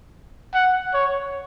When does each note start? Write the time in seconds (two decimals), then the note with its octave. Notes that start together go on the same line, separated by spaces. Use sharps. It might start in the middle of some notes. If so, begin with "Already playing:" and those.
0.54 F#5
0.94 C#5